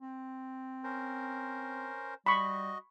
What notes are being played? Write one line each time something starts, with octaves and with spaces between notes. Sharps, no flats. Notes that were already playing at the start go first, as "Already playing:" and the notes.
C4
C#4 A#4 C5
G3 F#4 D#5 B5 C#6